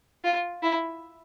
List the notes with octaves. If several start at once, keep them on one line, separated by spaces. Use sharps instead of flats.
F4
E4